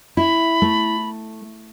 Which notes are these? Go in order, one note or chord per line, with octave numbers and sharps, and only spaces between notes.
E4 B5
A3